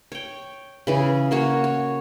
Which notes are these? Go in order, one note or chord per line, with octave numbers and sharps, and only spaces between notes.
C#5 G5
C#3 E3 G#4
A#3 F#4 C#5
C#5